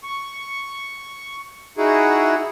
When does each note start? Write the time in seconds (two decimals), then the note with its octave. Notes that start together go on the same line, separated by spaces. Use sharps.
0.03 C#6
1.78 D#4 E4 F#4 G#4